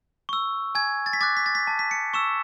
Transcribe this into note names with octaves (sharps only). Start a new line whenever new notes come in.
C#6 E6
G#5 G#6
A6
B6
D6 F#6 A6
B6
A6
B6
A5
B6
C#7
C#6 E6 E7